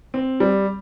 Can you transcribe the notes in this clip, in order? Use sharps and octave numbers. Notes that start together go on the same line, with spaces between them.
C4
G3